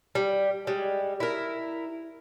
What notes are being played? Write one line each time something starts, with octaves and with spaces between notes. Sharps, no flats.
G3
G3 G#3
E4 A#4